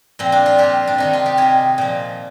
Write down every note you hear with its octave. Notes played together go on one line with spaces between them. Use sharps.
A#2 F3 C4
D4
F4
A#2 F3 G4
D4
C3 D#3 D#4
F4
G4
C3 D#3 G#4
A#2 F3